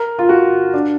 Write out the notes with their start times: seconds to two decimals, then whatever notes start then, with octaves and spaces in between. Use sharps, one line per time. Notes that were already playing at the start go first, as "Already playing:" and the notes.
Already playing: A#4
0.19 F4
0.29 F#4
0.74 D4